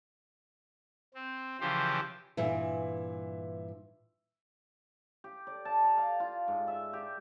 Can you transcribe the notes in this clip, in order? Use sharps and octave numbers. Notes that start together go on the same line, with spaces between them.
C4
C#3 E3 F3 G4 C5
G2 A#2 E3 E5
G4
D5
A5
A#5
F5
F4
G#2
E5
G4